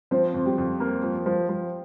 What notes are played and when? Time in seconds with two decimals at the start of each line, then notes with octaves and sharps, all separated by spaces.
0.11 F3 C4 C5
0.34 F2
0.46 G3 G4
0.58 F2
0.80 A#3
1.03 F3
1.26 F3
1.49 F3